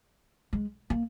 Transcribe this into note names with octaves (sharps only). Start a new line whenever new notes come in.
G#3
A#3